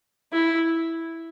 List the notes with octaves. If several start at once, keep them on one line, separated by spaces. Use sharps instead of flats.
E4